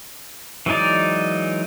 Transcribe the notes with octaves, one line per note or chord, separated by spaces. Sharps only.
E3 F#3 G#3 D#4 D5